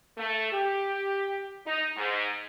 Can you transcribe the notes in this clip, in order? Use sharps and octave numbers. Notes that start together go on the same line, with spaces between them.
A3
G4
D#4
G#2